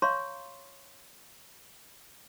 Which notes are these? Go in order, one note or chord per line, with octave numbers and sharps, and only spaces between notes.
C#5 F5 A#5 C6 C#6